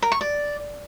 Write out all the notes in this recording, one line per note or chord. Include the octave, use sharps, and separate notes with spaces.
A#4
C#6
D5